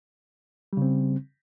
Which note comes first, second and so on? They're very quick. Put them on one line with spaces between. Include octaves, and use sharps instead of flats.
G3 C#3 C4